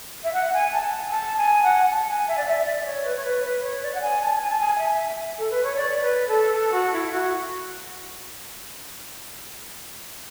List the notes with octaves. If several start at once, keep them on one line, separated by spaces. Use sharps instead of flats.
E5
F#5
G#5
A5
A5
G#5
F#5
A5
G#5
E5
D5
E5
D5
C#5
B4
C#5
B4
B4
C#5
D5
F#5
G#5
A5
G#5
A5
G#5
E5
A4
B4
C#5
D5
B4
A4
A4
F#4
E4
F#4